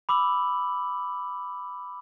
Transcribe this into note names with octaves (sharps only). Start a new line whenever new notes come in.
B5 D6 E6 F#7